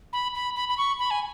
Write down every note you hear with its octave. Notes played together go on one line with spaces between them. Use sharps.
B5
B5
B5
B5
C#6
B5
G#5